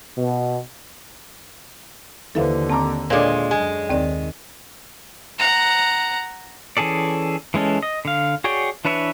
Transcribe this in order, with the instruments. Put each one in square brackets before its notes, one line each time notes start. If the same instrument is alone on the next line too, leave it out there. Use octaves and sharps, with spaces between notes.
[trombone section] B2
[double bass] D#2 D3 [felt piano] E3 B4 C5 [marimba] A4 E5 F5
[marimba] C4 [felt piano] A5 A#5 D6
[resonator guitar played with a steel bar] A#2 G#3 [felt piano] D4 A4 C#5 [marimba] A#4 F5 D6
[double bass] F#2 [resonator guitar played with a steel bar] G#3 [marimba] G#5
[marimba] D#2 C4 D5 [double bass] D#3
[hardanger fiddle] F#5 A#5
[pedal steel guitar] E3 C#4 G#4 A4 D5
E3 G#3 C#4 A4
D#5
D3 F5
F#4 G#4 C#5 D5 G5
E3 D4 B4 C#5 E5